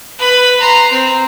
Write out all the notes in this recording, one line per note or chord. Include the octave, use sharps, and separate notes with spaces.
B4 B5
A#5 C6
C4